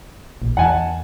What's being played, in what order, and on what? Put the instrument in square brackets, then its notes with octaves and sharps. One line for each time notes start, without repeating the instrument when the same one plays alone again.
[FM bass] A#1
[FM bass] E2 [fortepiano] F#5 G#5 A5